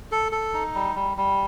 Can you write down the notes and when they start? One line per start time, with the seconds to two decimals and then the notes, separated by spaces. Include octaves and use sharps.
0.12 A4
0.32 A4
0.54 D#4
0.75 G3
0.95 G3
1.17 G3